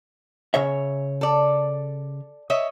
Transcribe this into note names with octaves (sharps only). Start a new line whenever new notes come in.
C#3 C#5 E5
A4 D5
C#5 D#5 E5